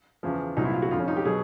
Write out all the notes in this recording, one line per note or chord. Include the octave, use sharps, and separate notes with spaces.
E2 C#3 F3
C2 A#2 F#3 D#4
E4
F4
F#4
F2 D3 F3 F4
C#4
D#4
G4
B2 F#3 G#4